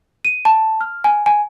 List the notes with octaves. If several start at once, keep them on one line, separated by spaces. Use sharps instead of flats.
D#7
A5
F6
G#5
G#5